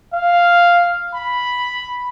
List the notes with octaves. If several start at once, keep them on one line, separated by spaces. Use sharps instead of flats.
F5
B5